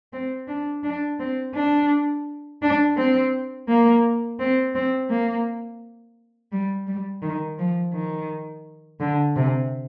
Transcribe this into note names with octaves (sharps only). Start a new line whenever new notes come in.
C4
D4
D4
C4
D4
D4
C4
A#3
C4
C4
A#3
G3
G3
D#3
F3
D#3
D3
C3